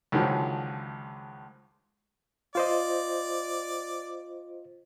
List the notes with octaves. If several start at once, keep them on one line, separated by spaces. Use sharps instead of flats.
C#2 D3 D#3 F3 F#3 G#3
F4 C5 D5 D#5